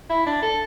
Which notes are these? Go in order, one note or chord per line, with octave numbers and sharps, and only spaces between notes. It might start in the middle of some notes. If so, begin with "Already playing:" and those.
E4
D4
A4